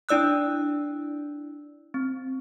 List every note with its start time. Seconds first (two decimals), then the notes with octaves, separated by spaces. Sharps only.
0.09 D4 E4 D5 E6 F#6
1.94 C4